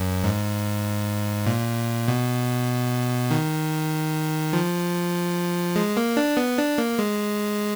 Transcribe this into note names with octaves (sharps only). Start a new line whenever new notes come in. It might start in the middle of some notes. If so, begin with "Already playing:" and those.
Already playing: F#2
G#2
A#2
B2
D#3
F3
G#3
A#3
D4
B3
D4
A#3
G#3